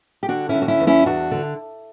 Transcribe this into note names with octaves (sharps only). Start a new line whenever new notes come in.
G4
D3 D4 F#4
C#4 E4
D3
F#4
C#4 E4
E2
C#4 E4
E2 D4 F#4
D3